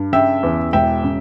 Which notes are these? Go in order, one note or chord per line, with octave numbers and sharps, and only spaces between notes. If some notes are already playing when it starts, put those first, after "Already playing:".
Already playing: G2
C#3 E5 G5
E2
E1 E5 G5
C#3